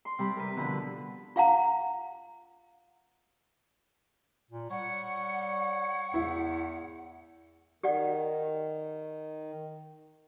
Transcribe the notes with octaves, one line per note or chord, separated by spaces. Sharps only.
C6
C3 G3 B5
A#4 B4
B2 D3 F3 B5
F4 F5 F#5 A#5
A#2
G3 C#5 F#5
E2 E4
D#3 G4 D5 F#5